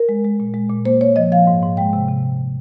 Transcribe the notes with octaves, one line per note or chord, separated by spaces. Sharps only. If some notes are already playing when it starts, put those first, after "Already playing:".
Already playing: A#4
G#3
G#3
A#2
G#3
A#2
A#3 C5
A#3 C#5
F3 D#5
F3 F5
G#2
G#2
G#3 G5
C3
C3